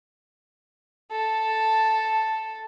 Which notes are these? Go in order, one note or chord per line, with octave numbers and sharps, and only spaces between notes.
A4 A5